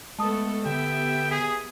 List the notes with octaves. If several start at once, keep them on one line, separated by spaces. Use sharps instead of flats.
G#3 A3 B3 A4 A5 D#6
D3 B3 G4 E5 G5
G#4 B6